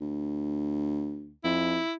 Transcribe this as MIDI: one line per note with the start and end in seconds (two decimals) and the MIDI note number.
0.01 1.34 38
1.44 1.79 41
1.44 1.93 64